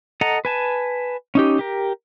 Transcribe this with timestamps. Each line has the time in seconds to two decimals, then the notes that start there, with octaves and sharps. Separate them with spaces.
0.21 A4 D#5 F#5 A#5
0.45 B4 G#5 A5
1.35 C#4 D#4 G4
1.59 G4 A#4